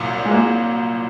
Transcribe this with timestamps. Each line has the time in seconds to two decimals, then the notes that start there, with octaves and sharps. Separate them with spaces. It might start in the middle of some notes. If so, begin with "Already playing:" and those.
Already playing: C2 A#2 F#3
0.25 G#3
0.31 A#3